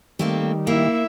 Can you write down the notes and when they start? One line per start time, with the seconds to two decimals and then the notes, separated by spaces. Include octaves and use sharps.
0.19 D#3 G3 A3 A#3 C4
0.67 A#3 E4 E5